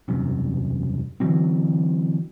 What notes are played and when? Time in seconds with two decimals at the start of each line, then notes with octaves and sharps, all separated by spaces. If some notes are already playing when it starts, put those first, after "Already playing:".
0.08 E1 C2 F#2 C3
1.20 D3 E3 F#3 C4